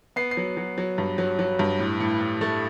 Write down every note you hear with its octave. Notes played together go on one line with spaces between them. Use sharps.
B3 C7
C7
F#3
F#3
F#3
G2
F#3
F#3
G2
A2
A2
A2
A3